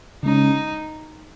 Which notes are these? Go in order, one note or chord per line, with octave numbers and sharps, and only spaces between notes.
C#3 G#3 C#4 D#4